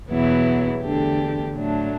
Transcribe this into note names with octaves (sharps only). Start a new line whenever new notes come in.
E2 B2 F#3 B3 E4
E2 D3 A3 D4 G4
A2 F#3 A3 D4